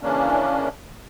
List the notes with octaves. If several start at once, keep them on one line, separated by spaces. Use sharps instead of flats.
C#3 E3 A#3 C#4 D4